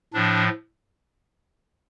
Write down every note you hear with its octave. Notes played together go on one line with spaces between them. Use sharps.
A2 F3 D4